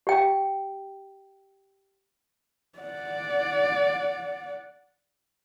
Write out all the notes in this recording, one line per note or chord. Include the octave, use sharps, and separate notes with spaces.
G4 G5
D5 F#5